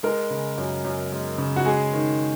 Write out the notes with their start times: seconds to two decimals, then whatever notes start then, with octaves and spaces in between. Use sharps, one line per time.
0.03 G#3 A#4
0.30 C#3
0.58 F#2
0.84 F#2
1.12 G#3
1.38 C#3
1.56 F#4
1.65 G#3 G#4
1.93 D#3